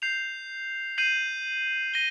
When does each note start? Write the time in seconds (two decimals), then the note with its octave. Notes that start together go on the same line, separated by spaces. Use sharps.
0.02 G6 C7 F7
0.98 G6 C7 D#7 F#7
1.94 A#6 D#7 G7